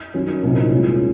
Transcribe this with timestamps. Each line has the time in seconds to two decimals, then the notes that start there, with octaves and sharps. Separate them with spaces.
0.14 D#3 F#3 C#4
0.43 C2 A#2 F#3 C4 D#4
0.71 D#2 D#3 G#3 C#4 F4